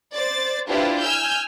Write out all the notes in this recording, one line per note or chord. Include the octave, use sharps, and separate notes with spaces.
C5 D5 A6
D4 E4 F4 G4 B4 C5
G#5 E6 F6 G6